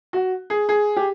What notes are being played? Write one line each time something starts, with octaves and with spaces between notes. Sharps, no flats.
F#4
G#4
G#4
G4